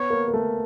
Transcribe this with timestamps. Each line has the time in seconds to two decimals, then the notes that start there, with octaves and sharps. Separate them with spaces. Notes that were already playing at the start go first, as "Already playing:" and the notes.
Already playing: B3 C#5
0.10 A#3
0.28 A#3
0.33 A3